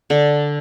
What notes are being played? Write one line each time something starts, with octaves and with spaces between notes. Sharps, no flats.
D3